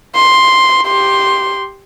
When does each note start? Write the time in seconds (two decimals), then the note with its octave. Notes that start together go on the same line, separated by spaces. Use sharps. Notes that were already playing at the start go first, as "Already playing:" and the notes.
0.15 C6
0.85 G4 C6